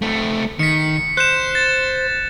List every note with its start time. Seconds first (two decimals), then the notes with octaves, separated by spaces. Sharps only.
0.02 A3 C4
0.59 D#3 B6 C#7
1.17 C5 F#6 G6 E7
1.55 A6